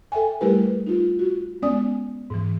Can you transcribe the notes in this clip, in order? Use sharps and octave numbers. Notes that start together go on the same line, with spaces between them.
A4 E5 G5 G#5
G3 A3 E4 G4 A#4 B4
D#4 F4
F#4
G#3 B3 C#4 D5 G#5 D#6
G#2 E3